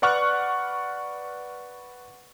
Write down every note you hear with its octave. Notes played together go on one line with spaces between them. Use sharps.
B4 D5 F#5 C#6 F6 F#6